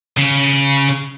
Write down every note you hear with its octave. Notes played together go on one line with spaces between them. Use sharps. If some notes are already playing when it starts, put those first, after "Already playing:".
C#3